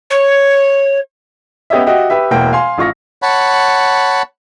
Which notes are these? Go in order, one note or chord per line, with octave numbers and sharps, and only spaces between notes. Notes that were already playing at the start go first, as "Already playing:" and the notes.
C#5
B3 C#4 G4 C#5 D#5 E5
F#4 G4 D#5 E5 G5
G4 B4 E5
E1 B2 A#3 E4 G5
F5 G#5 C6
A1 F4 C#6 A#6
C#5 F#5 A5 B5